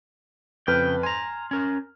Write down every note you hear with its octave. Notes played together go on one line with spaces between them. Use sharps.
F2 C#3 B4 G5 F6
G#5 A#5 C6
C#4 A#4